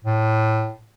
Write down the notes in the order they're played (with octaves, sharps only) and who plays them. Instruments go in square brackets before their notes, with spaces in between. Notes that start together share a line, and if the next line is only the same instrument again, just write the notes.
[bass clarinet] A2